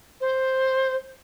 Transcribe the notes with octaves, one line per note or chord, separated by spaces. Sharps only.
C5